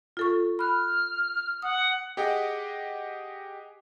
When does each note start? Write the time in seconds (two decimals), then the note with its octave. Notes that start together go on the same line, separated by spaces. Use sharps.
0.17 F4 A4 C#6
0.59 B5 F6 F#6
1.62 F#5 D#6
2.17 G4 G#4 D#5 F#5 G5